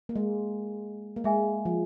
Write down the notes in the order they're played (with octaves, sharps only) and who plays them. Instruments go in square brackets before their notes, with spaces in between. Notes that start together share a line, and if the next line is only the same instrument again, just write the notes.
[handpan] A#3
G#3
A#3
[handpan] G#3 [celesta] G#4 E5 G#5
[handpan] F3